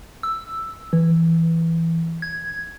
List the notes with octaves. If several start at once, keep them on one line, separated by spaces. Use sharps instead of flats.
E6
E3
G#6